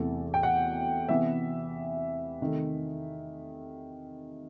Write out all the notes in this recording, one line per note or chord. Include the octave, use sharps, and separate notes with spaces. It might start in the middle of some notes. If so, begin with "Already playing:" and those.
Already playing: E2 C3 E3 A3
G5
F#5
C3 E3 B3 E5
C3 D#3 A3